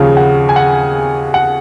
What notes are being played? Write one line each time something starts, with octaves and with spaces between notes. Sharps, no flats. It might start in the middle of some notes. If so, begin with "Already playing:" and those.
Already playing: D#2 C#3 F3 F5
F#5
G#5
F#5
F#5